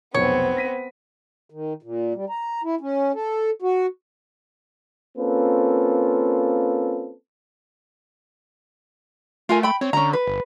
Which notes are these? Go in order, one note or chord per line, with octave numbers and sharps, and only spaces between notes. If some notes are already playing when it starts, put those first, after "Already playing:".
F1 B1 B3 C4 C#5
A#6 B6 D#7
D#3
A#2
G3
A#5
E4
C#4
A4
F#4
A#3 C4 C#4 F4 A4 B4
A3 F4 A#4 G#5
G5 B5
C4 C#5
D3 C#4 A#5
B4
G1